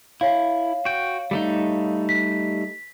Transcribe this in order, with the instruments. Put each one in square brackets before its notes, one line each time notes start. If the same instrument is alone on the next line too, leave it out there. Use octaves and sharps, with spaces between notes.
[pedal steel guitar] E4 [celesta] C#5 F5
[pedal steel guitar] F#4 G5
G3 A3 D#4
[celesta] B6